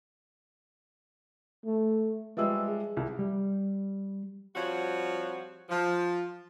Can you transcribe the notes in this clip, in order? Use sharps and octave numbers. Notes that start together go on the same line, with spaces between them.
A3
F3 G3 G#3 B4 E5 E6
G#4
C2
G3
F3 G3 C4 F#4 C#5
F3